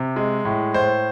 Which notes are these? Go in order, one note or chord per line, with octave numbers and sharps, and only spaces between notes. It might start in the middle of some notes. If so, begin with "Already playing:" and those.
Already playing: C3
G#3
A2
A2 C5